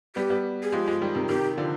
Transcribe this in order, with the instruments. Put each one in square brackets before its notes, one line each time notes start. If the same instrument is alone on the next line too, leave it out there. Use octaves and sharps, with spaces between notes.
[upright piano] G3 B3 [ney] G4
[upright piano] G3 B3
[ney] G#4
[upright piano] F3 G#3 [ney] G4
[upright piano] F3 G#3
D#3 G3
C3 D#3
[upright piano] C3 D#3 [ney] G4
[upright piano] D3 F3